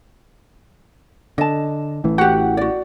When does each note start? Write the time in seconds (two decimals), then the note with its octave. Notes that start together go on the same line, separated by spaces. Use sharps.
1.38 D3 D#5 A5
2.04 A1 A2 E3
2.18 F#4 G4 F#5
2.57 F#4 D5